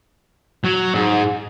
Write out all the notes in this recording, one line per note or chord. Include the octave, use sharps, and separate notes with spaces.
F#3
G#2